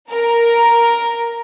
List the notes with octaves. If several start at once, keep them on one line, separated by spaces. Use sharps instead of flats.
A#4